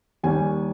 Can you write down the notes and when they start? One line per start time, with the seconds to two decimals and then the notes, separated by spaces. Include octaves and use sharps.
0.23 D#2 D#3 G3 G#5